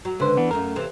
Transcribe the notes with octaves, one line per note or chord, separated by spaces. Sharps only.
F#3
C#2 D3 B4 C5
E3 B3 D4
F#2 A3 A#3 A#4
C3 E3 C4